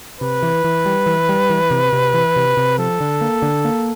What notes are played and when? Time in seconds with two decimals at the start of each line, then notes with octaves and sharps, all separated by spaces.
0.21 C3 B4
0.43 E3
0.64 E3
0.86 G3
1.06 E3
1.29 G3
1.50 E3
1.71 C3
1.93 C3
2.14 E3
2.36 C3
2.57 C3
2.78 F3 A4
3.00 D3
3.21 A#3
3.42 D3
3.65 A#3